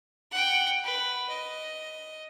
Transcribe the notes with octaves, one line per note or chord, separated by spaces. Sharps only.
F#5 G5
B4
D#5